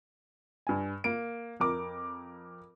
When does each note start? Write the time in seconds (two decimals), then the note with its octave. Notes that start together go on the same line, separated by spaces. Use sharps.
0.67 G2 G#5
1.04 A#3 D7
1.60 F2 A#4 D6